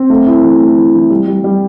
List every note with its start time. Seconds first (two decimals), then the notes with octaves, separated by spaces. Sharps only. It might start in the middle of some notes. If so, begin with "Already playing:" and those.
Already playing: C4
0.10 A3
0.27 E4
0.43 E3
0.60 A3
0.77 E3
0.94 E3
1.10 G3
1.27 G3
1.44 G3